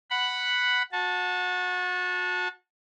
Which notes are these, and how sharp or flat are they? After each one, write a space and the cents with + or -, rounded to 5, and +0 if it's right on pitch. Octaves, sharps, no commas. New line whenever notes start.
F#5 +0 B5 +0
F#4 -30 A5 +0